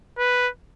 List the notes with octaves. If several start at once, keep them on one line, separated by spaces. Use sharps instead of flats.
B4